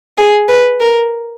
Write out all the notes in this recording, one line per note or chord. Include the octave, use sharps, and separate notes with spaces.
G#4
B4
A#4